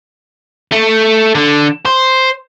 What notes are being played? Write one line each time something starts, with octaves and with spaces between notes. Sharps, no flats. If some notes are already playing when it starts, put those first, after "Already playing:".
A3
D3
C5